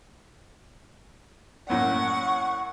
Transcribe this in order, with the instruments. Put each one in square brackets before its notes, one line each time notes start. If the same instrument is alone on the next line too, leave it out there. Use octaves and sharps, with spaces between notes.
[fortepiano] F#2 A2 A#3 [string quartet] F#5 [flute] C#6